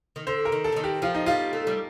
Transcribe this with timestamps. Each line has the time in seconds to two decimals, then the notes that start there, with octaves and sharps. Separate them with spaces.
0.16 D#3
0.27 D3 C5
0.45 A#4
0.52 D#3
0.64 A4
0.72 D3
0.76 D#3
0.84 G4
1.02 F3 F4
1.15 D#4
1.26 G3 F4
1.53 A3
1.67 G3